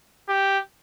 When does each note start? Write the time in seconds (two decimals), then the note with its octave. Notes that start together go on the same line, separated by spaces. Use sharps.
0.29 G4